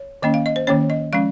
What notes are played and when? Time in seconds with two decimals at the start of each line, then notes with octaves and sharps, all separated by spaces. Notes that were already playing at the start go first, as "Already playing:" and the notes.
Already playing: C#5
0.22 D#3 A#3 C#4 D#5
0.34 F5
0.46 D#5
0.56 C5
0.67 D#3 A#3 C#4 C#5
0.90 D#5
1.13 F3 G#3 C#4 F5